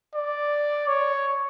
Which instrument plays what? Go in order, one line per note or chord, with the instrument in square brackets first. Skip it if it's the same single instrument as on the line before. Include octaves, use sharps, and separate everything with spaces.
[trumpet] D5
C#5